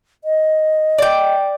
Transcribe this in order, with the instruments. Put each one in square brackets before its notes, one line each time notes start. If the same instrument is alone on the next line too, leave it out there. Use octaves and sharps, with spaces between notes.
[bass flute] D#5
[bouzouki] D5 G5